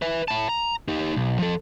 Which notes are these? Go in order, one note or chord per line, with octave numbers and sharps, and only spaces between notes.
B4 E5
E4 A5
A#5
D#4 G4
B1
F3 A4